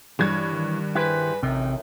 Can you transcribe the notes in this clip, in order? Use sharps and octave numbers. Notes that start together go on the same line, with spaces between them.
G2 E3 C#5 G#6
D#3
E4 G4 G#4 B4 C5
A1 F#2 A2 C3 D#3